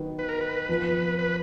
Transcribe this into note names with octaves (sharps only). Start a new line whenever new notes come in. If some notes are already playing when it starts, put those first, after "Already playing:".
Already playing: D#3 F#3 B3
B4
A#4
B4
F2 F3 B3
B4